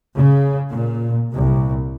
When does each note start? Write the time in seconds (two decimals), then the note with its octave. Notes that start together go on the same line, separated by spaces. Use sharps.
0.16 C#3
0.71 A#2
1.32 C2